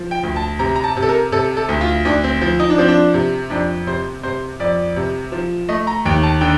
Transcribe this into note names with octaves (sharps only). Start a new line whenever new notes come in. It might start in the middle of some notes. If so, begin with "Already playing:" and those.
Already playing: F3
G5
D2
A5
C3 A#5
A#5
A5
C3
A4
A#4
C3 A4
A4
D2
F4
D2 D4
C4
F3
D#4
D4
F3 C4
D4
C3
F2 D4
C3 C5
C3 C5
F2 D5
C3
F3
A3 D#5
A#5
D#2 G5
A5
D3 G5